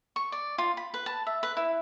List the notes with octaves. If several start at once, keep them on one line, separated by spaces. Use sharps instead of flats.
C#6
D5
F4
B5
B4
A5
E5
B4
E4